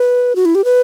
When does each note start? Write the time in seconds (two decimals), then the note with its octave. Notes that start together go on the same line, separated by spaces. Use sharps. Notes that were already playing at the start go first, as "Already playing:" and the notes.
Already playing: B4
0.36 F#4
0.45 E4
0.55 G4
0.64 B4